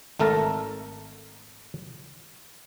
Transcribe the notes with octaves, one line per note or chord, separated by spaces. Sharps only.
G#1 A3 A4 A#4